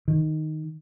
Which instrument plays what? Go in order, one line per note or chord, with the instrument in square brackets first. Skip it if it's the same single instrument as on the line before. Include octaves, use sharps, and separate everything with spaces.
[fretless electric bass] D#3